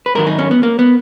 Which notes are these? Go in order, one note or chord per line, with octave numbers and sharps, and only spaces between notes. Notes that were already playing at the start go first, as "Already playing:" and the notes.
B4
G#2 D#3 F#3 A#4
D#4
C#4
B3
A#3
B3